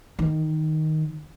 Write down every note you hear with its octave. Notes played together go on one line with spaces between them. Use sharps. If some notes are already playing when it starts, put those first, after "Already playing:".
D#3